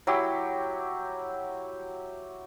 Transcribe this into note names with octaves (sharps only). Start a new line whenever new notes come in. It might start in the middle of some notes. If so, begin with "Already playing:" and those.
F#3 E4 G4